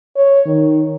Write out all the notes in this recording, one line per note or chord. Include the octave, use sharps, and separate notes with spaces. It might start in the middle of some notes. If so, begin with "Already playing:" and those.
C#5
D#3